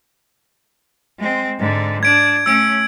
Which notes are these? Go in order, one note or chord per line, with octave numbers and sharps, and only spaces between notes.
G#3 C4
G#2 D3
D4 G#6 D7
A3 C#4 E6 D7